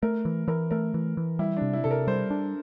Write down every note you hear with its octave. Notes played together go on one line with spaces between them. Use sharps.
A3 A#4
E3
E3 A#4
A3 A#4
E3
E3
G3 E4
D4
C3
E4
C3 A4
A#4
G3 C5
D4